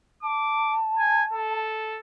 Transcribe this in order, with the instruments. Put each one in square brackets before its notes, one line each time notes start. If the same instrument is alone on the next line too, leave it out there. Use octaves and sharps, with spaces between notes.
[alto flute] A5 [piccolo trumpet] D6
[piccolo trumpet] G#5
A4